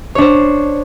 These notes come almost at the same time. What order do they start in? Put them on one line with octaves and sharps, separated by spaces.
C#5 D4 C5